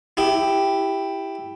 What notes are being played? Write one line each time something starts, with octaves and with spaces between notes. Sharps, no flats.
E4 G4